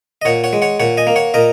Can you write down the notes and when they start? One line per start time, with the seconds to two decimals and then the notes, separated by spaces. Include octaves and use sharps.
0.22 D#5
0.25 A#2 C#5 F#5
0.44 C#5 F#5
0.53 G#3
0.62 C#5 F#5
0.80 A#2 C#5 F#5
0.97 D#5 G#5
1.07 A#3
1.16 C#5 F#5
1.34 A#2 A#4 D#5